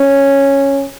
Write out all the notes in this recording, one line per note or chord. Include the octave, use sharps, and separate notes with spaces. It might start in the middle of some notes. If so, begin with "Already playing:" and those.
Already playing: C#4